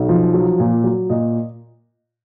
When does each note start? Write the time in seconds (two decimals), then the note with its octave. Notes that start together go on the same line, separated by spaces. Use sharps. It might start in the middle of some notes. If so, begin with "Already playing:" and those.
Already playing: B1
0.09 F3
0.34 F#3
0.60 A#2
0.84 F#3
1.10 A#2 D#5